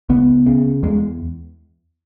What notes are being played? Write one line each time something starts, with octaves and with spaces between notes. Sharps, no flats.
C#2 B3
C#3
E2 G#3